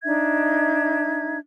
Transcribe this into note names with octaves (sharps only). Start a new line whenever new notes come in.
D4 D#4 E5 G#6